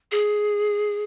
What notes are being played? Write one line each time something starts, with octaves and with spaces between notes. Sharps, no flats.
G#4